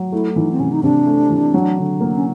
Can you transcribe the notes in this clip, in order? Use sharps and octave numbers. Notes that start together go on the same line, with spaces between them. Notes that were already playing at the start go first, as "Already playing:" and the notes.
Already playing: F#3
A3 E4
E3 D#4
C4
C3 C#4
D#4
C3 D4
A3
E3
F#3
D3
A#3
C#4